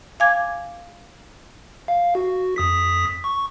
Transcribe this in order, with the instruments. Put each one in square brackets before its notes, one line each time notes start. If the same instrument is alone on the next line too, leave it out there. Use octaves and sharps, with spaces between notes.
[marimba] F5 G#5 D6 G#6
[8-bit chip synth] F5
F#4
F2 D#6 B6
C#6